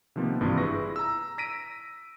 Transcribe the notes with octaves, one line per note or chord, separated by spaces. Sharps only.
C3 D#3 F3 A#3 B3
G#1 G2 C3 E3 F4
E4 G#4 B4 C#6 A#6
A#5 E6
E6 A#6 B6 D7 D#7